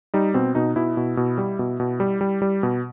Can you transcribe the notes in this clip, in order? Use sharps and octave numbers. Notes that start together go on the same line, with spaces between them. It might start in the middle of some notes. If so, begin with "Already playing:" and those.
G3 D#4
B2 C4
B2 D#4
B2 E4
B2
B2
G3
B2
B2
G3
G3
G3
B2